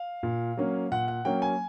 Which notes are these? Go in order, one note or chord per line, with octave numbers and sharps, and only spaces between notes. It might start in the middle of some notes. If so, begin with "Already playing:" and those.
Already playing: F5
A#2
F#3 A#3 C#4
A#2 F#5
F#5
F#3 A#3 C#4 G5
G#5